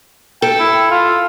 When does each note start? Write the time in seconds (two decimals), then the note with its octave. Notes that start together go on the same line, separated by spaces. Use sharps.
0.42 A4 G5
0.59 E4
0.91 F4